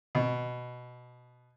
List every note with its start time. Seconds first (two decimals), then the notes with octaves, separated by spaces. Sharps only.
0.15 B2